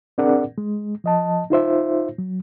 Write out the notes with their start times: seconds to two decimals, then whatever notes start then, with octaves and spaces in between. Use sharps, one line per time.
0.18 C4 D4 G#4 A#4 D5 F#5
0.58 G#3
1.04 F3 D#5 A5
1.50 D#4 F4 C5 E5
2.18 F#3